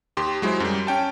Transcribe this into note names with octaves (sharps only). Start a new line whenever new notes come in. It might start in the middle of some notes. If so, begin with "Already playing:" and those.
D#2 G4 C6
F#3 G#3 E4 C5
F#2 G3
C#4 G5 A5